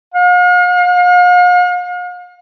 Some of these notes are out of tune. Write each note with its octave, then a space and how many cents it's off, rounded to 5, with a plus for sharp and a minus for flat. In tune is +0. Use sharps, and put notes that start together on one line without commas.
F5 +45